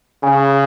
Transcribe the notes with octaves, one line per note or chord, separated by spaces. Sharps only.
C#3 G#5